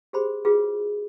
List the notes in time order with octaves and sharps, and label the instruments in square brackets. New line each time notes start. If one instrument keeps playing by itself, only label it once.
[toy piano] G4 G#4 C5 B5 C6
F4 F#4 G#4 B4